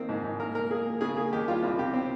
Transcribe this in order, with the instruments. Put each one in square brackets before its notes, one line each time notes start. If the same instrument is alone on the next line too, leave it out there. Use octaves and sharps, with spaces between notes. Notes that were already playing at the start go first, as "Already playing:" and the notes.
Already playing: [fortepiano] D#3 A#3 C4
G#2
G#2
A#3 A#4
A#3 A#4
A#3 G#4
A#3
C#3 G#4
A#3 G#4
D#2 G4
G3 F4
C2 F4
C3 G4
C4